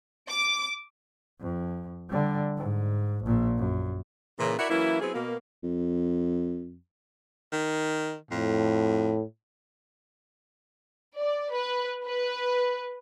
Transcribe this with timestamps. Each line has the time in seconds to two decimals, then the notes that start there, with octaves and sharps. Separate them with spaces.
0.29 D6
1.41 F2
2.09 D3 G3
2.57 G#2
3.25 A#1 A#2
3.58 F#2
4.39 A#2 C#3 E3
4.58 E4 F#4 A#4 D5 E5 F#5
4.70 E3 F#3 A#3 C#4 E4
5.01 F#3 B3 C4 E4 G#4
5.14 B2 A#3
5.63 F2
7.52 D#3
8.31 F2 A2
11.17 D5
11.52 B4
12.05 B4